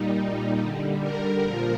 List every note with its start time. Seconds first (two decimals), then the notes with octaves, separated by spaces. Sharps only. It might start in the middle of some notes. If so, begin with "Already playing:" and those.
Already playing: A#2 G3 D#4
0.58 D3 G3
1.01 A#4
1.43 A#2 F3 A#4